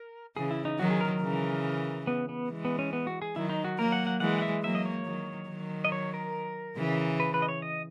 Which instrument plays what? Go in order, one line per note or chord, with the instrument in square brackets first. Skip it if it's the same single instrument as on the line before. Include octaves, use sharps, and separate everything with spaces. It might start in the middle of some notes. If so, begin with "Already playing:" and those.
Already playing: [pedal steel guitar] A#4
[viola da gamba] C#3 E3 [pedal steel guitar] G#4
[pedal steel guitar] E4
D#4
[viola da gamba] D#3 F#3 [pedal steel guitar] F#4
[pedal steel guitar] G#4
A#4
A#4
[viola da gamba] C#3 E3
[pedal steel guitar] B3
B3
[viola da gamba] E3 G#3
[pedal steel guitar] B3
C#4
B3
F#4
G#4
[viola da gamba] D#3 F#3 [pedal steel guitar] E4
[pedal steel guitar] D#4
F#4
[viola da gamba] F#3 A#3 [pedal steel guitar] A#4
[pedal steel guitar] F#5
F#5
[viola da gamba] E3 G#3 [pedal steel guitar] F#5
[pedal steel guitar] F#5
E5
[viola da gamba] F#3 A#3 [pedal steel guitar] E5
[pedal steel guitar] D#5
C#5
[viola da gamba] D#3 F#3
D#3 F#3
[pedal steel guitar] D#5
C#5
A#4
[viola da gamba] C#3 E3
[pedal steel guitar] B4
B4
D#5
C#5
D#5